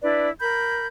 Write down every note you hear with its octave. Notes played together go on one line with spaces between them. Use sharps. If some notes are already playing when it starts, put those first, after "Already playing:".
D4 E4 B4 D5
A#4 B5 G6